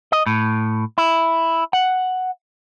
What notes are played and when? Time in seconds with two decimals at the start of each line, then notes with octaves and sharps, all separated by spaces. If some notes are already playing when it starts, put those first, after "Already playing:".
0.12 D#5
0.26 A2
0.98 E4
1.73 F#5